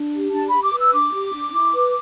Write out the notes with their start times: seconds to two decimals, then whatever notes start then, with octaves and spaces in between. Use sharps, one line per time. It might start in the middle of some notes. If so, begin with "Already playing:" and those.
Already playing: D4
0.13 G4
0.32 D4 A5
0.48 G4 B5
0.62 D6
0.73 B4 E6
0.92 D4 D6
1.12 G4
1.33 D4
1.53 E4
1.74 B4